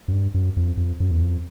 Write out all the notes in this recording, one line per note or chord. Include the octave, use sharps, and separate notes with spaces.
F#2
G2
F#2
F2
F2
F#2
E2
F2